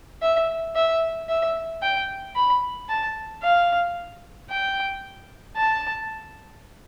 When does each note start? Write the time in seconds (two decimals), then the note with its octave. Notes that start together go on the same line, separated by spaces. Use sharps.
0.22 E5
0.76 E5
1.29 E5
1.82 G5
2.36 B5
2.89 A5
3.42 F5
4.50 G5
5.56 A5